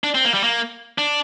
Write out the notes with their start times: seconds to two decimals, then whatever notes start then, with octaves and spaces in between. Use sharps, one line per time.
0.04 D4
0.15 C4
0.25 A#3
0.34 G3
0.44 A#3
0.98 D4